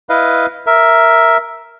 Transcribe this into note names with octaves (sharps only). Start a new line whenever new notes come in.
E4 B4 D#5 F5
A#4 E5